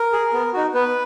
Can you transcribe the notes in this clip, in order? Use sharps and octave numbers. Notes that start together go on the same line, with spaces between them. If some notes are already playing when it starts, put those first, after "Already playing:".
Already playing: A#4
G#4
B3
D#4 F#4
B3 B4